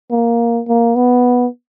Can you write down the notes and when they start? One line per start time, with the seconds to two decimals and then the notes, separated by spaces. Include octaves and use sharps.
0.11 A#3
0.68 A#3
0.96 B3